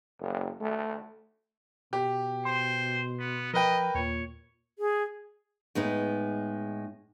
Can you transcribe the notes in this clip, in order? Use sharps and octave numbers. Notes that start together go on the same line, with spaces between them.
F#1
A3
B2 G4
C5 C6
B3
F3 A#4 B4 D#5 G5
D#2 A#2 C#5
G#4
A2 G#3 B3 D#4